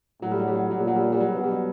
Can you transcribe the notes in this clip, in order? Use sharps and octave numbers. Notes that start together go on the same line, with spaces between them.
A2 F#3
G3
F#3
G3
F#3
G3
F#3
A#2 G3
F#3
G3
F#3
G3
F#3
G3
B2 F#3
G3
F#3